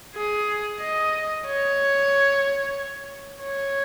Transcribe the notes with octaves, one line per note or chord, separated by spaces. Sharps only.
G#4
D#5
C#5
C#5